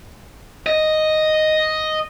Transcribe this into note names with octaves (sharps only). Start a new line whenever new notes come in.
D#5